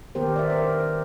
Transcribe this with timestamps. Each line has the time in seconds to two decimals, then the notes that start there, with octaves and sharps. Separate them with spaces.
0.15 D#3 B3 G4 A#4 C5
0.36 D5 E5
0.50 A#4 C5